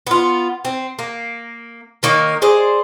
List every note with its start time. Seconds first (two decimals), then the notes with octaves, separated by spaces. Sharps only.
0.07 B3 F4
0.65 C4
0.99 A#3
2.03 D#3 A#3 D#4 C#5
2.42 G#4 C5 D5 D#5